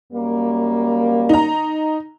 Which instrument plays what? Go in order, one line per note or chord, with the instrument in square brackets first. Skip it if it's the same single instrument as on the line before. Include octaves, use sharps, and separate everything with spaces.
[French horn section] F#2 G3 A#3
[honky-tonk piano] D#4 A#5